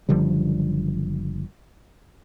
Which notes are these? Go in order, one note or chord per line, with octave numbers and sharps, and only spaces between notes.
F#1 D3 F3 G3